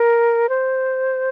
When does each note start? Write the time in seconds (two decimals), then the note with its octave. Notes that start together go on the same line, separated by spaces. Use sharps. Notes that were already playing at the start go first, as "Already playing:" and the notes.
Already playing: A#4
0.49 C5